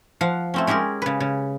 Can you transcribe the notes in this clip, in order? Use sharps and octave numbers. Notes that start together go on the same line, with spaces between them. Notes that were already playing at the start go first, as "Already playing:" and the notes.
F3 F5 F#5
A3 C4 C#4
G#3 C#4 G4 G#4 A#4
C#3 B4
C#3